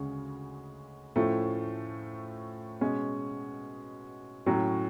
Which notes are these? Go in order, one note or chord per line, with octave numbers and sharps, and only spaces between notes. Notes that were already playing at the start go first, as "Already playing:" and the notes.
Already playing: D2 C#3 G#3 C#4
A2 F3 A3 C#4
B2 G#3 C#4
A2 F#3 C#4